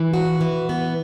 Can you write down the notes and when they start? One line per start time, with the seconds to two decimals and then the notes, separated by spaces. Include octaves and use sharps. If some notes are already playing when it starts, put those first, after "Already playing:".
Already playing: E3
0.14 F#4
0.41 E3
0.69 B3